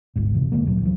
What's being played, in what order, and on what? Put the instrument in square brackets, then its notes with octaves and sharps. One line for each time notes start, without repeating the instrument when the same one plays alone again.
[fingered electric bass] G1 D2 G#2
G#1 F2 C3 E3
E1 D3 G#3 A#3
D2 A#2 F#3
D2 E3 F#3